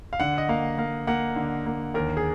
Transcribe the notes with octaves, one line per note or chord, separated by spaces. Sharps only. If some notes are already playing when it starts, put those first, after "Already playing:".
F5
D3 F#5
D#5
A#3 F5
A#3 F5
A#3 F#5
D3
A#3
D#2 A#4
G#4